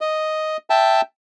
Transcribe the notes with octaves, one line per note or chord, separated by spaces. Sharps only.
D#5
E5 G5 A5